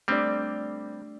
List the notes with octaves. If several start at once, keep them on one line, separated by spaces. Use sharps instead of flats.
G3 A3 C4 D4 D5